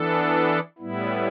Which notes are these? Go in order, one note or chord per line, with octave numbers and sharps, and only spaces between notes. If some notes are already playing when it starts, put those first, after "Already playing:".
Already playing: E3 B3 D4 A4
A2 G3 B3 E4